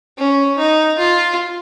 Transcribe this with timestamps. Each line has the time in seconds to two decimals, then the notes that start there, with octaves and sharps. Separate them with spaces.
0.18 C#4
0.58 D#4
0.98 F4